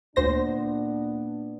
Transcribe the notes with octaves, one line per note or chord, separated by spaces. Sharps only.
D2 A#2 B3 D4 C5 A#6